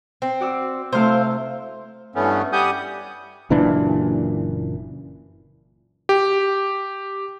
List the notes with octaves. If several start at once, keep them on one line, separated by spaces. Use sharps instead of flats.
C4
F#4 D5 E6
C3 A3 E4 C5 F5
G2 E3 A3 B3 C#4
G3 G4 F#5 G#5 D#6 G6
F#1 A#2 E3 D4
G4